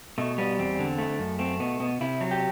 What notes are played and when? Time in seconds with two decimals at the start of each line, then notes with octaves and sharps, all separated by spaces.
0.18 B2 A3
0.38 G3 B3
0.59 E2 C4
0.79 D3
0.99 A3
1.19 F#2
1.39 A3 C4
1.60 B2 B3
1.80 B2 B3
2.01 C3 E4
2.21 F#3
2.31 G4